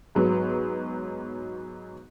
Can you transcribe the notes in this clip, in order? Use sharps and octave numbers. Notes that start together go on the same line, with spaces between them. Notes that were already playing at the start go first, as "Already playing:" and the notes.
G#2 F#3 B3